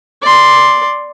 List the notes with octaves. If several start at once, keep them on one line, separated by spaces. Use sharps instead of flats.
D5 C6